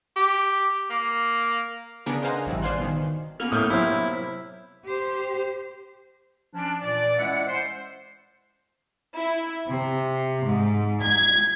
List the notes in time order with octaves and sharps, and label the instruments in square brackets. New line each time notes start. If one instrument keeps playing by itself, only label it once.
[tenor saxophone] G4
A#3
[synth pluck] C#3 B3 D4 G#4 A#4
C5 D#5 F5 F#5 G#5 A#5
A1 G2 D#3 E3
C5 D5 F5 G#5 C6 F#6
B2 D#3
[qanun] A#3 B3 C#4 [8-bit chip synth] F6
[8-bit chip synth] A2 [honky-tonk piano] D#6 F6 G6
[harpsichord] F#2 C4 D6 [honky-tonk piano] C3 [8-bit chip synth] E4
[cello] G4 C5
[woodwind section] F3 C#4 D4
A#2 E3 D5
G#3 C#4 E4 D5 E5 F#5
C5
[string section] E4
C3
G#2
G#6